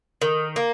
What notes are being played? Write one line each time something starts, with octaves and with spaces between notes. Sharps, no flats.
D#3
A#3